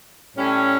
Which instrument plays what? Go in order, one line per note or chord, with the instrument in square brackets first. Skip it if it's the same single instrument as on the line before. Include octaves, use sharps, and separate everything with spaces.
[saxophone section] A2 G3 C#4 E4